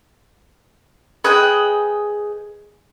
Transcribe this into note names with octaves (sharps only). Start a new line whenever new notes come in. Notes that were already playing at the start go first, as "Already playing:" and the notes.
G#4 B4 D#5 G5 F#6